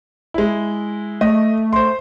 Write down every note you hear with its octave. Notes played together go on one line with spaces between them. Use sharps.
G#3 E4
A3 D#5
C5 C6